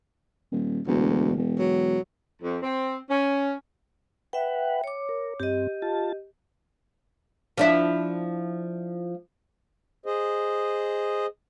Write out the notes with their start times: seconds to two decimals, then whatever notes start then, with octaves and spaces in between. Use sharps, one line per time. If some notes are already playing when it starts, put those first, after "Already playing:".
0.52 D#1
0.87 E1 D2
1.37 E1
1.59 F#3
2.42 F2
2.62 C4
3.09 C#4
4.33 B4 E5 F#5 G5
4.84 C#5 D6
5.09 A#4
5.40 G2 C4 G4 D#5
5.82 F4 A5
7.57 F3 D4 E4
10.06 G#4 C5 D#5